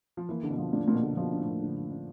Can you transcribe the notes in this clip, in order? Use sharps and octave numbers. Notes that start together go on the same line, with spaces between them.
F3
E3 A#3
D3
B2
F3
A#2 D4
A2
A#2 A#3
B2
D3
B2 F3
D4
A2
A#3
D3
F3
D4